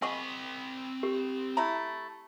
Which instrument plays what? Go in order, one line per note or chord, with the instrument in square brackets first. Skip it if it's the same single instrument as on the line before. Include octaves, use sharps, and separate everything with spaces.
[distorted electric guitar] C4 B5 [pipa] G#4 D#5 [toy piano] F#5 C#6 D6
[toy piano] G4
[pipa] A3 E4 A#5